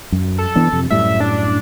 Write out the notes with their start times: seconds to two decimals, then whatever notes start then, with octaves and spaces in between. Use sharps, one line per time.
0.12 F#2
0.38 A4
0.55 E3 B3 D4
0.73 F2 C3
0.90 F#2 A2 G3 E5
1.20 D4